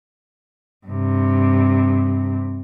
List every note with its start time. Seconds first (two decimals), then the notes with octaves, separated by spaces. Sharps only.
0.87 G2 C3